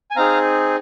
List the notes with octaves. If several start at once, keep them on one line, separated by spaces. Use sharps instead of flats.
G#5
C4 D#4 G#4 F5 A#5